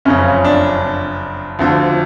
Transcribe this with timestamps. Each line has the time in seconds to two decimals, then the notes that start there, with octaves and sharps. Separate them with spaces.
0.05 F#1 F2 C#3 C#4
0.44 D4
1.59 D2 D3 F3